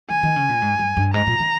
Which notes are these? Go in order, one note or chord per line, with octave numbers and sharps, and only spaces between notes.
D#3 G#5
D#3
C#3
A#2
G#2
G2
G2
G#2 A#5
A#2
D#3